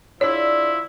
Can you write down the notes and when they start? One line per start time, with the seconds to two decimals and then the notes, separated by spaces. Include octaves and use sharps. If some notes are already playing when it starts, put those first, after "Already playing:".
0.21 F3 D4 E4 G#4 C#5 D5